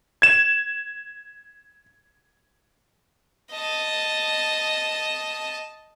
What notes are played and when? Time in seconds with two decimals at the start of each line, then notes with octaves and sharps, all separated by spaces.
0.22 G#6 E7
3.52 D#5 A5